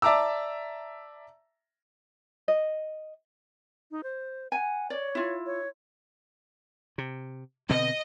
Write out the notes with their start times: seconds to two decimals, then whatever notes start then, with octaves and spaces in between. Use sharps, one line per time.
0.02 D5 E5 A5 A#5 D6 E6
2.48 D#5
3.91 D#4
4.03 C5
4.52 F#5 G#5
4.90 C#5 D5
5.15 E4 F4
5.46 C#5
6.98 C3
7.69 B2 D3 C4 D#5